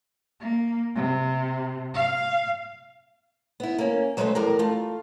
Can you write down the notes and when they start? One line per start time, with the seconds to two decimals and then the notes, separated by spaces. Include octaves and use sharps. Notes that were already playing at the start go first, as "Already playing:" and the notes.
0.40 A#3
0.96 C3
1.95 F5
3.60 B3 E4
3.79 A#3 C#4
4.17 F#3 G#3 A3 B4 C5 E5
4.35 E2 A2 G4 A#4
4.59 A3 F4